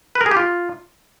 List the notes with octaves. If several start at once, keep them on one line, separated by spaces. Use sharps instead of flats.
B4
A#4
G#4
G4
F4